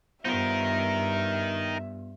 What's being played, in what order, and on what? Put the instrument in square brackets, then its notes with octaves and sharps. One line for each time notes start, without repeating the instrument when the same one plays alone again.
[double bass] G2 [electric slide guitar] B3 F4 C5 [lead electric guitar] D#4 A#4 [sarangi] E5